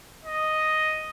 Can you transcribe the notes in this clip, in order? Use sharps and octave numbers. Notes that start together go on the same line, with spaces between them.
D#5